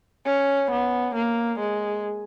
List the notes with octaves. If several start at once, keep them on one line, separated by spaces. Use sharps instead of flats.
C#4
B3
A#3
G#3